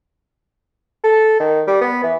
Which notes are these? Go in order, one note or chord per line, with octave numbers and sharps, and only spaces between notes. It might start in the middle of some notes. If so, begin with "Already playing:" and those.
A4
D#3
G3
B3
E3